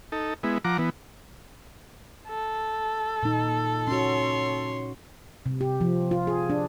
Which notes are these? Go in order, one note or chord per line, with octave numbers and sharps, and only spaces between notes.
D#4 A4
G#3 B3 E4
F3 F#5 A#5 D6
E3 B3
A4
A#2 D#4
C#4 F#4 C#5 C6
C3
G4
F3
F4
G#4
D4